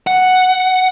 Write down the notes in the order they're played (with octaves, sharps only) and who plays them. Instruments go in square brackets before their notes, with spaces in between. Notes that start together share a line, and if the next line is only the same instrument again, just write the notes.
[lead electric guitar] F#5